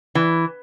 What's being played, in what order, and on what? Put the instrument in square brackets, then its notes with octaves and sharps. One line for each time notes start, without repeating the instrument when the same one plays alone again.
[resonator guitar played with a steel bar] E3